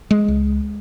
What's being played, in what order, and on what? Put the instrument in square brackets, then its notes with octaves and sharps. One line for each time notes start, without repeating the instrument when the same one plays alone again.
[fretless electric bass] G#3
C#2